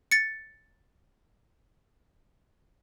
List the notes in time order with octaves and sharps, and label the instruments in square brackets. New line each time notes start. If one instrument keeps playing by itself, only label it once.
[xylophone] A6 C#7